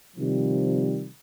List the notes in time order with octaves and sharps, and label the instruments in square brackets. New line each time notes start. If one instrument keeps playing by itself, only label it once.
[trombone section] C3 D#3 F3 G3